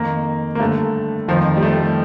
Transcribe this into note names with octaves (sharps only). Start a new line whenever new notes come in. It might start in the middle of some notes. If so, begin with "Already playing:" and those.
Already playing: F2 D#3 A#3
A#3
G2 D3 A3
F2 D#3 F3
G3
A3